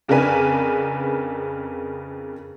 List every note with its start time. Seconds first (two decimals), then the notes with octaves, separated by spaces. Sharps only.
0.08 F2 C#3 D4 A#4 B4 G#5